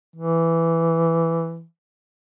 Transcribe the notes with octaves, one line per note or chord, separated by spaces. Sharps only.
E3